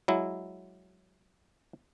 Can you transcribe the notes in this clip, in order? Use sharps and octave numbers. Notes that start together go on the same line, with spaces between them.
F#3 G#3 E4